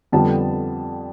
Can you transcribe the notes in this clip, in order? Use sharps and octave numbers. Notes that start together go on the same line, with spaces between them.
F2 D3 G3 B3 A5